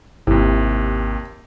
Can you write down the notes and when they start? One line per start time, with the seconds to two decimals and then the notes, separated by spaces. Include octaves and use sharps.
0.27 G#1 D#2 C3 E4